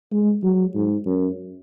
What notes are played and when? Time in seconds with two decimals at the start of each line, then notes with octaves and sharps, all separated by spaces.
0.12 G#3
0.43 F#3
0.75 G#2
1.06 F#2